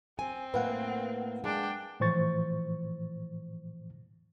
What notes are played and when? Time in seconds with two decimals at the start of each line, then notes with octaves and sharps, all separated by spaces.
0.19 C4 G#5
0.54 A2 A#3 B4 F5 F#5
1.44 G#3 D4 G5
2.00 A2 E3 F3 C5 C#6 A6